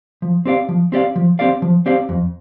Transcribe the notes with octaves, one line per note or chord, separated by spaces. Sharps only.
F3
C4 G4 D5 F5
F3
C4 G4 D5 F5
F3
C4 G4 D5 F5
F3
C4 G4 D5 F5
F2